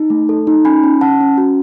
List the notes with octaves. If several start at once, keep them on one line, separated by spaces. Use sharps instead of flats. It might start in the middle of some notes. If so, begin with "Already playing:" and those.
Already playing: D#4
A3
A4
D#4
C#4 G#5 B5
C#4
C#4 F#5 A5
C#4
F#4